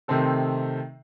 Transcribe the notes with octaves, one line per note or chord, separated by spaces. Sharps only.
C3 D#3 A3 C4 A4